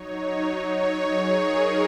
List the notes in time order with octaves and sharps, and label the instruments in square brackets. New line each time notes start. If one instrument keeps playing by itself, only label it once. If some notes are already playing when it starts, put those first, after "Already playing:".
Already playing: [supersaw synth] F#3 D#4 C#5
C#5
C#5
G#4
A#4